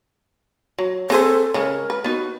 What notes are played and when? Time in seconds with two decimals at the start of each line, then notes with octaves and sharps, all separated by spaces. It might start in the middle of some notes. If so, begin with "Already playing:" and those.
0.79 F#3
1.10 C4 G#4 A4 C5
1.54 C#3 G#3 C#4 A#4
1.90 B4
2.04 B3 D#4 F#4